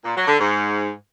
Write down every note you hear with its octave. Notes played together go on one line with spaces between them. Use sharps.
A#2
F#3
D3
G#2